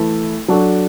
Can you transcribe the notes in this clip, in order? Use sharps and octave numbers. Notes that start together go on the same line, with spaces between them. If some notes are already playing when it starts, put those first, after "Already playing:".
Already playing: E3 A3 E4 A4
F#3 D4 F#4 A4